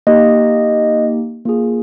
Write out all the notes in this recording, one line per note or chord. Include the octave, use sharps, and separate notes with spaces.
A#3 D#4 G4 D#5
A#3 F4 G#4